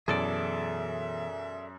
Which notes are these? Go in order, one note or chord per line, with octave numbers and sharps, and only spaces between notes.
F#2 B2 E3 G#4 A4 D5 E5